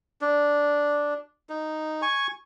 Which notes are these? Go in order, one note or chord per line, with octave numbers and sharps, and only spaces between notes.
D4
D#4
G#5 C#6